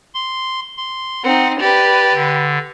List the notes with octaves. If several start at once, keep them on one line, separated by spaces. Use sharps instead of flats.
C6
C6
C4 D#4 F#5
G4 B4 D5
D3